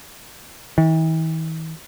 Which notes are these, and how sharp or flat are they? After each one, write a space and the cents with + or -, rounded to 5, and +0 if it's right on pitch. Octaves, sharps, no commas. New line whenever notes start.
E3 -45